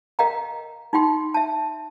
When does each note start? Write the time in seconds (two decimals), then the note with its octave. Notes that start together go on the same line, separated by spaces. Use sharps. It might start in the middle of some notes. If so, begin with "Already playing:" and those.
0.19 A#4 D#5 F5 G5 A#5
0.93 D#4 F4 G5 C6
1.34 E5 A5